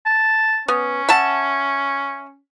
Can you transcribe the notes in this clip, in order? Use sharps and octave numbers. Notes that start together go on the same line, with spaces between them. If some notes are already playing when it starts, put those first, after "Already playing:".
A5
B3 C#4
E5 F#5 A5